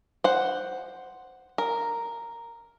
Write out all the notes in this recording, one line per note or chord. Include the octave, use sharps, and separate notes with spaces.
C5 F#5
A#4